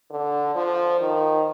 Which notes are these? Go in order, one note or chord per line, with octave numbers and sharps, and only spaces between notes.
D3
F3
D#3